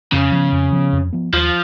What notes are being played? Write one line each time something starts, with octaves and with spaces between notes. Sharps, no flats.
F2 C#3
F3 B3
F2
F3 B3
F2
F3 B3
D#2 F3